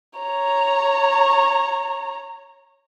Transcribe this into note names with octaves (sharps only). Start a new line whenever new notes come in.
C#5 A#5